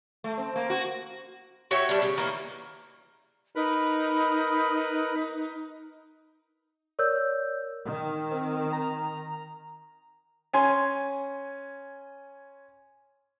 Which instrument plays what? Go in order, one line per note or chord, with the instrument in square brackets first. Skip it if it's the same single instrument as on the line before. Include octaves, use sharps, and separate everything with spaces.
[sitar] A3
C4
A#3
F#4
[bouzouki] F#4 C#5 E5 G5
G3 D4
C#3
D#3 E3 A#3 A#4
[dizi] D#4 [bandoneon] A#4 B4 B5
[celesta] A#4 C#5 D5 E6 G6
[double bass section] D#3
[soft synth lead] C4
A#5
[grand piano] C#4 G#5 C6